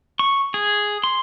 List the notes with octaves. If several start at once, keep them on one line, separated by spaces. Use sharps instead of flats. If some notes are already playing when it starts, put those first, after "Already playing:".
C#6
G#4
C6